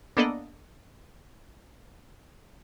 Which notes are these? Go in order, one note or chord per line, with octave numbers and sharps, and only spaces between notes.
A#3 B3 D4 A4 D5 D#5